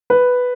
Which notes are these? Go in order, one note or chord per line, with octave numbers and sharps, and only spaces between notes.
B4